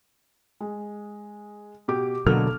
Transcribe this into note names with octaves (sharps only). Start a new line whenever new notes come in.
G#3
B2 G4 D6
B2 D3 F#3 A#3 A4 F6